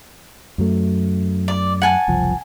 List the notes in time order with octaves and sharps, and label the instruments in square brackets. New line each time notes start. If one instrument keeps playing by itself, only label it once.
[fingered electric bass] F#2 F#3 A3
[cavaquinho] D5
F#5 G#5 A5
[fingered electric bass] F#1 C2 F3